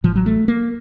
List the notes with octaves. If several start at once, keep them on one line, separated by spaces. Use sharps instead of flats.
A1 A2 F3
F#3
A3
A#3